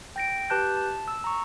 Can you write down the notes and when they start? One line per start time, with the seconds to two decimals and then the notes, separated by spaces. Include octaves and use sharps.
0.16 G5 A#6 D7
0.50 G4 B4 A5 F#6 G6
0.77 A5
1.08 E6
1.24 A#5 C#6